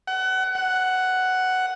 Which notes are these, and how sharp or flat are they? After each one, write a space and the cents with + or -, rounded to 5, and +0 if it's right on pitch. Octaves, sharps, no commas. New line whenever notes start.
F#5 +25
F#5 +5